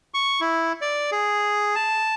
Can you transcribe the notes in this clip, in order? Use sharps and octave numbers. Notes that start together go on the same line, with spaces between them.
C#6
E4
D5
G#4
A5